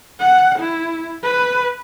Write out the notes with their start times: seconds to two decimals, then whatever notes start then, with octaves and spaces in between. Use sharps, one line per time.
0.20 F#5
0.59 E4
1.23 B4